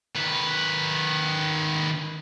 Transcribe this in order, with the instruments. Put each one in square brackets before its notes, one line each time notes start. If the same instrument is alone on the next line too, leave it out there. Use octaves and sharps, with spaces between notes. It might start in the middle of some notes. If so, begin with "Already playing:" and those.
[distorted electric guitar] D#3 B4